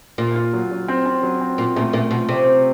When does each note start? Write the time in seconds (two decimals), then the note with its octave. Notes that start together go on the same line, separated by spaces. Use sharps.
0.18 A#2 F4
0.35 F4
0.53 F#3
0.71 F#3
0.88 C4
1.06 C4
1.23 F#3
1.41 C4
1.58 A#2 F4
1.76 A#2 A3
1.93 A#2 A3
2.11 B2 F4
2.29 C3 A3
2.46 C4